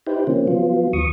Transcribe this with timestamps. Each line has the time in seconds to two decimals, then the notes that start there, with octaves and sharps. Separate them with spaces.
0.07 D#4 E4 G4 B4 C5
0.27 C#3 F3 A#3 C4 C#4
0.47 F3 F#3 B3 F4
0.93 D#2 C#6 D#6